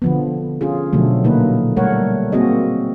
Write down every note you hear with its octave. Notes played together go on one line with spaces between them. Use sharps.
D3 F3 B3
C#4 F4 G#4
B2 D3 F3 F#3 A3
A#2 D3 A#3 D#4 B4
G3 A3 A#4 C#5 F#5
A#3 C4 F#4 G#4 D#5